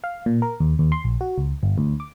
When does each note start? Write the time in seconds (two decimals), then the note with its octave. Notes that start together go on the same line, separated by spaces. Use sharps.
0.04 F5
0.26 A#2
0.42 A#4
0.60 D#2
0.79 D#2
0.92 C6
1.04 A#1
1.21 F#4
1.38 C#2
1.63 G1
1.78 D2
2.00 D6